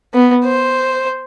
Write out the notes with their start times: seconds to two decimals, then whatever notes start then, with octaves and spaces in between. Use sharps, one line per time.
0.13 B3
0.44 C5